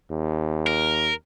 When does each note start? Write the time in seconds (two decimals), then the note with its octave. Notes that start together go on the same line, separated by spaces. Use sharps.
0.11 D#2
0.67 A#4